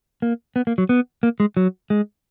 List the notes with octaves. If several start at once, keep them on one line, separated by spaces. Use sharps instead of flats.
A#3
B3
A#3
F#3
B3
A#3
G#3
F#3
G#3